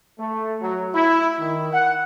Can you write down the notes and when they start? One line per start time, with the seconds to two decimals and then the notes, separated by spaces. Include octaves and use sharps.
0.18 A3
0.61 F#3
0.94 E4
1.39 D#3
1.73 F#5